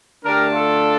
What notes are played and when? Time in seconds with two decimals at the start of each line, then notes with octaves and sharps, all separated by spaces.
0.24 D3 A3 D4 G4 A#4
0.52 F4 A4